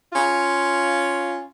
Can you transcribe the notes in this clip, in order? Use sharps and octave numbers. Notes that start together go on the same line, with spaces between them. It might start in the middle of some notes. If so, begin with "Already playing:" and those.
C#4 F4